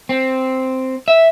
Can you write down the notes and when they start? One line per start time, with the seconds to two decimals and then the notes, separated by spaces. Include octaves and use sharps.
0.09 C4
1.08 E5